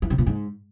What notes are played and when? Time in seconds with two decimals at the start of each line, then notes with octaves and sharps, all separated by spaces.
0.02 E3
0.10 C3
0.18 A#2
0.26 G#2